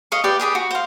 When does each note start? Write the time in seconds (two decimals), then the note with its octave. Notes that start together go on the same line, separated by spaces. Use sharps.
0.12 D#5 F5 C#6
0.24 G4 B4 D5 G5
0.40 G4 G#4 B4 D6
0.55 F#4
0.71 C5 F5